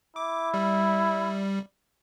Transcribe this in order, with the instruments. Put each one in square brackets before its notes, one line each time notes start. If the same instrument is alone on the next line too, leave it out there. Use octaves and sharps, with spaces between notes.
[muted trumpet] E4 [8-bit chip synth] D6
[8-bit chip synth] G3